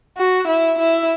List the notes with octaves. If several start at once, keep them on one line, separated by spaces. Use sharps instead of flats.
F#4
E4
E4